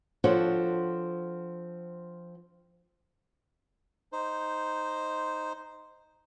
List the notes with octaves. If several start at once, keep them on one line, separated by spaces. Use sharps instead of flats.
F3 C4 D4 F#4 A4 C#5
D#4 C5